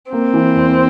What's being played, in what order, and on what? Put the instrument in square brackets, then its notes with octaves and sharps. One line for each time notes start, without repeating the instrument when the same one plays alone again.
[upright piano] A#3 [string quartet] C4
[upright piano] E3
E2